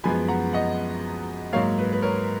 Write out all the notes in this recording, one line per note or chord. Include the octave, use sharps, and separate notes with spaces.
F#2 F3 G#3 B3 G#5 B5
F#5 A#5
D#5 F#5
G#2 F#3 A#3 C#5 F5
B4
B4
A#4 C#5